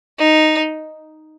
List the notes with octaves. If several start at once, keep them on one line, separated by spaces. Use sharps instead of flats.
D#4